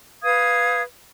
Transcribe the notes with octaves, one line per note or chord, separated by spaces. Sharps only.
B4 F5 D#6 G#6